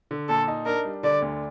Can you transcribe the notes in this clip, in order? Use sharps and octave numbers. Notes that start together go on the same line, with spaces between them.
D3
A#2 A4
D#4
D4 A#4
G3
D3 D5
D2